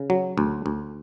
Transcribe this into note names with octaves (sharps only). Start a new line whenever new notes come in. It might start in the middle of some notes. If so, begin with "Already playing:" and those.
Already playing: C#3
F#3
D2
D2